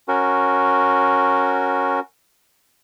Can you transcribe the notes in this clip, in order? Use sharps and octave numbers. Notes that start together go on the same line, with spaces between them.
C#4 F#4 A#4